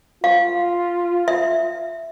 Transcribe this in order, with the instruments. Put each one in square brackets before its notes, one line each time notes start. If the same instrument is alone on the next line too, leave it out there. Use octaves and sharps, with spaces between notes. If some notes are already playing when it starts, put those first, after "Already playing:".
[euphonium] F4 [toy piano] F5
[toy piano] E5